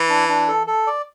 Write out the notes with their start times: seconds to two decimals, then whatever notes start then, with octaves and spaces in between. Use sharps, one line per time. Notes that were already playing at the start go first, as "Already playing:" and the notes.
Already playing: E3
0.09 D4
0.29 D4
0.48 A4
0.67 A4
0.87 D5